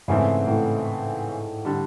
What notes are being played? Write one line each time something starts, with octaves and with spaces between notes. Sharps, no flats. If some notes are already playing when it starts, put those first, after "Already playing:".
G#2 C#3 E3 A3 C4 E4
A2
D3 G3